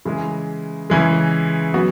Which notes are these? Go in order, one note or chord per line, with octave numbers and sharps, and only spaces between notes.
C#3 E3 G#3
C#3 E3 G#3
F#3 B3 F#4